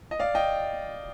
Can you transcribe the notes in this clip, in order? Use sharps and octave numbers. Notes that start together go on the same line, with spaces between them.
D#5
D5 F5
D#5 G5